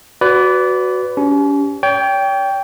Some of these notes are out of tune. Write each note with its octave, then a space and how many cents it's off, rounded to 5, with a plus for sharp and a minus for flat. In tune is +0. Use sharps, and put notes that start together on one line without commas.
F#4 +0 B4 +15 D5 -25
C#4 +40 G4 +0
C#5 +40 G5 +0